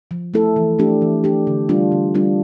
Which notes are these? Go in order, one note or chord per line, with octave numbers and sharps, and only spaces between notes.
F3
A3 E4 A4
E3
A3 D4 G4
E3
A3 D4 G4
D3
G3 D4 F4
D3
G3 D4 F4